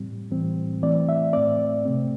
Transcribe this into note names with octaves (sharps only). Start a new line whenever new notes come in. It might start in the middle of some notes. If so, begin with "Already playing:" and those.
Already playing: A2 G3 C4
A2 E3 G3 C4
E3 A3 C4 D5
E5
A2 A3 C4 D5
C3 A3 C4